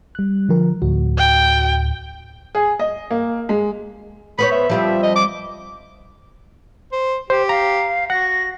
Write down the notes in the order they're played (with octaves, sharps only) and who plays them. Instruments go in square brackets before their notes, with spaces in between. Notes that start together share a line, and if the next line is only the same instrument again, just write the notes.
[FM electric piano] G3 F#6
D3 F3 A#4
D2 A2 F#4
[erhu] G5
[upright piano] G#4
D#5
A#3
G#3
[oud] B3 C5 C#5 [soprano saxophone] B5
[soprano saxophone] E5
[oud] F3 G3 C4
[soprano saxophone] D#5
D6
C5
[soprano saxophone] G4 [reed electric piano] C5
[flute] F5 [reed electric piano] A#5
[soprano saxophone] F#4 [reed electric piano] F#5 [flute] A#6